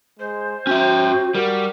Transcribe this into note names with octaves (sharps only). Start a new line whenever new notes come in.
G#3 C5
C#4 F#4 E5 G5
G3 F#4 A#4